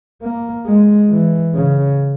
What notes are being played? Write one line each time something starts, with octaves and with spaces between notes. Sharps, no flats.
A#3
G#3
E3
C#3